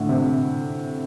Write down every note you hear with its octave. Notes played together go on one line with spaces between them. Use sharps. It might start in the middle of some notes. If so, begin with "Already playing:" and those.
Already playing: A2 D3
C3